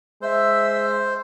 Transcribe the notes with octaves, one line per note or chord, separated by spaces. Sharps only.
G#3 C5 E5 E6